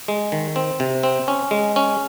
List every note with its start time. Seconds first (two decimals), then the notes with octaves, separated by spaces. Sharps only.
0.08 G#3
0.32 D#3
0.56 C4
0.80 C3
1.03 C4
1.28 C#4
1.51 G#3
1.76 C#4